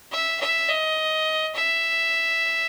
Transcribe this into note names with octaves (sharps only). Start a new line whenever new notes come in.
E5
E5
D#5
E5